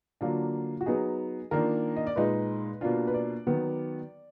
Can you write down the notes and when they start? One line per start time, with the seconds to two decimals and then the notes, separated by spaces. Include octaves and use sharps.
0.21 D3 F#3 A#3 D4 F4
0.81 F#4
0.86 F#3 B3 D#4 G#4
1.51 D#3 A#3 D4 F4 A#4
1.97 D#5
2.07 D5
2.16 A#2 G#3 D#4 B4
2.81 B2 A#3 D4 F4
3.07 B4
3.14 D5
3.47 D#3 F#3 B3